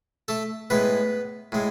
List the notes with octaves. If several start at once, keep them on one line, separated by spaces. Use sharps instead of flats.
A3 A4
A2 G#3 B3 B4
A2 G#3